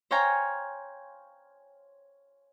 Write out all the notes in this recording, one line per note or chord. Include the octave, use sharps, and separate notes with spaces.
C5 C#5 F5 G5 G#5 A#5